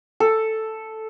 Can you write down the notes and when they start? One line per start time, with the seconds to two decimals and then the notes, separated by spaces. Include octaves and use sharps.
0.20 A4